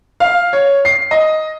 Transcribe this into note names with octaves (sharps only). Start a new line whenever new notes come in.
F5
C#5
C7
D#5